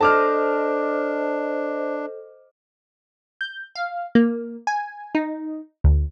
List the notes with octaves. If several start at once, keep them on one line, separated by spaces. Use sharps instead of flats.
D4 A4 C5 D#5 A5 D6 F6
G6
F5
A#3
G#5
D#4
D2